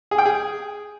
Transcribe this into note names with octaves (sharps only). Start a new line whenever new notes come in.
G#4
G5
G#4